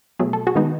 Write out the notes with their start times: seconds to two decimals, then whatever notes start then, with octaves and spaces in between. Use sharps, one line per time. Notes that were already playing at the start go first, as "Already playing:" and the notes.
0.19 B2 F#3 A3 G#4
0.33 A4
0.47 F#4 G#4
0.55 D#3 G#3 B3 D#4